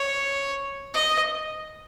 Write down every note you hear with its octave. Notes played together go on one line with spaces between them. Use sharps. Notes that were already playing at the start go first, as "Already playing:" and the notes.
Already playing: C#5
D#5